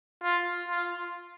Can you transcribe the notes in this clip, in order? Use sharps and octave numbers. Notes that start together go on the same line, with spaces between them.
F4
F4